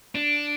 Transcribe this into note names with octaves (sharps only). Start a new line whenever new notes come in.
D4